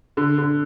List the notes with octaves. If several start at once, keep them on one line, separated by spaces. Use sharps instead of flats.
D3
D3